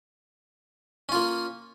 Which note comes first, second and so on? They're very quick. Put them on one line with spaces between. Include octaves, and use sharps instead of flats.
C#4 F4 A#3